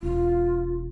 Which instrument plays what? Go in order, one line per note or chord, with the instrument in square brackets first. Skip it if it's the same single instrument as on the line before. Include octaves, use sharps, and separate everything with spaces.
[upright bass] E1 [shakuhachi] F4